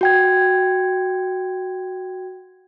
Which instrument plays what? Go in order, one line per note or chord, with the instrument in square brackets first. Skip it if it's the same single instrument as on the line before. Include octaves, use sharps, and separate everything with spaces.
[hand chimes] F#4 G5 G#6